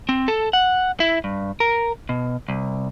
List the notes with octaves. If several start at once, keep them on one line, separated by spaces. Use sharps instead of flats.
C4
A4
F#5
E4
G2
A#4
B2
C2